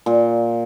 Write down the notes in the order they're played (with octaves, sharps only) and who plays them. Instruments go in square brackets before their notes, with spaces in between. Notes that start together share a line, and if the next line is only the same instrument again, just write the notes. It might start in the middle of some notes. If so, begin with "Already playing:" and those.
[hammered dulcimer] A#2